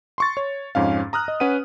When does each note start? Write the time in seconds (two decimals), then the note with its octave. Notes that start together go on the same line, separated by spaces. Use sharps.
0.18 C6 C#6 A6
0.37 C#5
0.75 F2 G#2 C#4 F5
1.13 A#5 D#6 F6 F#6
1.28 D#5
1.40 C#4 B4 F#5 D#7